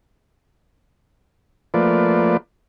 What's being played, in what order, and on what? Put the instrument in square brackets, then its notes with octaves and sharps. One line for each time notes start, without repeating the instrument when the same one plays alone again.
[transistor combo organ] F3 A3 A#3 F4 B4 D5